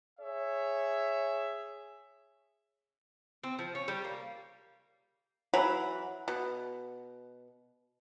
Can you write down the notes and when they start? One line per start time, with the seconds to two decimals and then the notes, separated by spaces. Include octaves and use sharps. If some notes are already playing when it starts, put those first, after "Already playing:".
0.20 G#4 C#5 E5
3.43 C4
3.59 F3
3.75 C#4
3.88 G3
4.04 A#3
5.54 E3 F#3 F#5 B5
6.28 B2